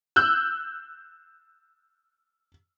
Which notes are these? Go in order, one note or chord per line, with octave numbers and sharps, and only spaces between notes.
E6 F#6 G6